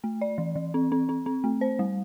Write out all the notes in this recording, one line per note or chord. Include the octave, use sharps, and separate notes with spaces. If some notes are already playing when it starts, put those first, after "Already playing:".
A3
D5
E3
E3
C4
C4
C4
C4
A3
C5
G3